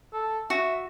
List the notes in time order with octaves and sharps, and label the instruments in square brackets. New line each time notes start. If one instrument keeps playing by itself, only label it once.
[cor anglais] A4
[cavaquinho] F#4 [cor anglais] E5